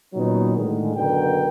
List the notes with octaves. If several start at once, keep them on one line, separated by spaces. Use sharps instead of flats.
A#2 D#3 F#3 B3 C#4 D#4
A2 D3 D#3 G#3
F#1 B2 D3 A#4 G5